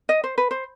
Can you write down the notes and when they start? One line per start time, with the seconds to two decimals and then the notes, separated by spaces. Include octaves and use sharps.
0.09 D#5
0.24 C5
0.38 B4
0.51 C5